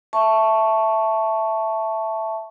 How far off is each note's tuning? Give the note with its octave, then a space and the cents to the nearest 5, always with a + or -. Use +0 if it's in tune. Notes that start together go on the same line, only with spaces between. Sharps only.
E5 +0 A5 +0 C#6 +0